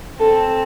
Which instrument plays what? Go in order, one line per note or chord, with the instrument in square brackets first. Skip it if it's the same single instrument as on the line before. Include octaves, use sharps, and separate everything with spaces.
[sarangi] C4 [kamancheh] A4